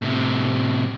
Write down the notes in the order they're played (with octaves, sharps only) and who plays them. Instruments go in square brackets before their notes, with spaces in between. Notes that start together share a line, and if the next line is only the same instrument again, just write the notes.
[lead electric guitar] A2 C3